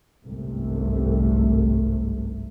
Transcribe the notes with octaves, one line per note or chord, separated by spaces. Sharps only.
G1 C2 G#2 C3 A3